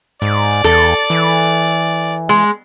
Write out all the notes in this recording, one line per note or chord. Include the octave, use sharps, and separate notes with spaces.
G#2 D5
E2 A4
E3
G#3